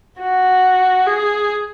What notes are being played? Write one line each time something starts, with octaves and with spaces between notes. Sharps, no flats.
F#4
G#4